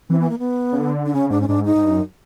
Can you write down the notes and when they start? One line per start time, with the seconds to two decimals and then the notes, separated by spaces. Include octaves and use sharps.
0.09 E3 C4
0.19 B3
0.29 A#3
0.39 B3
0.73 C#3
0.79 D3
1.06 D4
1.13 C#3 C#4
1.31 G#2 D4
1.41 C#4
1.48 G#2 D4
1.65 D#4
1.76 G#2
1.83 G2
1.91 F#2